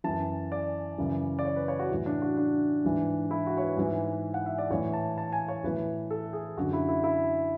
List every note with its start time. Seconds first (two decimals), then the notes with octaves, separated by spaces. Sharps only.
0.04 F#2 E3 A5
0.52 D5
0.98 F#2 C#3 E3
1.39 D5
1.45 C#5
1.56 B4
1.68 C#5
1.79 F#4
1.91 A2 E3
2.06 D4
2.22 F#4
2.37 D4
2.84 G#2 E3
3.31 E4
3.47 F#4
3.57 C#5
3.61 B4
3.77 G#2 E3
4.34 F#5
4.46 E5
4.58 D5
4.70 A2 E3 C#5
4.93 A5
5.18 A5
5.33 G#5
5.48 C#5
5.64 A2 E3 B4
6.11 A4
6.33 G#4
6.57 F#2 D3 F#4
6.73 E4
6.88 E4
7.04 E4